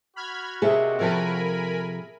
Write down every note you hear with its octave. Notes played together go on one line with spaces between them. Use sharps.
F#4 B5 F6 G#6
C3 A#3 G#4 A4 D#5 E5
C3 F3 A4 A#4 G#5 B5